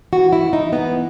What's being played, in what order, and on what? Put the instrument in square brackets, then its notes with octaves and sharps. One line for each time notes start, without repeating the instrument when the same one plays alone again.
[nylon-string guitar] E3 F#4
E4
E3
D#4
E3 B3